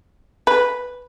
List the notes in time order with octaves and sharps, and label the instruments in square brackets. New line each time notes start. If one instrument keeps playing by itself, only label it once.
[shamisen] B4